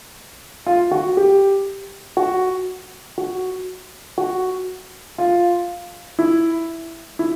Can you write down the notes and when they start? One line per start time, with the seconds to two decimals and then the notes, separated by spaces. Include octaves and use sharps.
0.67 F4
0.91 F#4
1.17 G4
2.17 F#4
3.18 F#4
4.18 F#4
5.18 F4
6.19 E4
7.19 E4